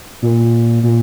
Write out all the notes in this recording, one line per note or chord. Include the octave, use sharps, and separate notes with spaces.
A#2
A#2